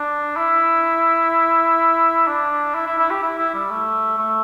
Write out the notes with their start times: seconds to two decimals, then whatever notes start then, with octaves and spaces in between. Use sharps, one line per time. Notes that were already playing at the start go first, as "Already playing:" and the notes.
Already playing: D4
0.37 E4
2.28 D4
2.75 E4
2.87 E4
2.98 E4
3.11 G4
3.22 E4
3.38 E4
3.54 G3
3.70 A3
4.18 A3